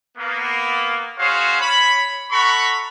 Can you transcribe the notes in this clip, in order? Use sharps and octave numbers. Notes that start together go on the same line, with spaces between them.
A#3 B3
C#4 F#4 G#4 C5 C#5 F5
C#5 B5
A4 F#5 A#5 B5 C#6